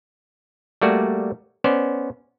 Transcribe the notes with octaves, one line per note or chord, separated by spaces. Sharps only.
G3 A3 A#3 F#4 D5
B3 C#4 C5 D5